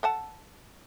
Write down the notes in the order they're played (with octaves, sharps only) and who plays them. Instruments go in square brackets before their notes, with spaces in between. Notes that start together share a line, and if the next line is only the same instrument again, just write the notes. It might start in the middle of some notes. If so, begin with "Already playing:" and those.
[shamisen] A4 F#5 A5